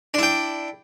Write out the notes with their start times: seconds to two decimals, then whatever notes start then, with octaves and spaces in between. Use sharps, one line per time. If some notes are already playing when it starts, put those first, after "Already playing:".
0.14 D4
0.18 E4
0.23 G5